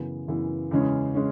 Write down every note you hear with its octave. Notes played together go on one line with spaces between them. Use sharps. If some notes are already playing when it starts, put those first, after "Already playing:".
Already playing: F#2 C#3 E3 B3
F#2 C#3 E3 B3
E2 C#3 G#3 C#4
G#3 C#4